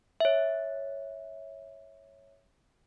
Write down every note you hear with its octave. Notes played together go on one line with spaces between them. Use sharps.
C#5 E5